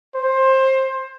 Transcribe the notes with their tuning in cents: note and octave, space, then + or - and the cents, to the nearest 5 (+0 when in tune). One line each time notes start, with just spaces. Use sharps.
C5 +20